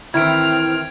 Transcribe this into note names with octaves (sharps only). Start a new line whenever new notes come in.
D#3 E3 C4 E4 F6 G#6 D7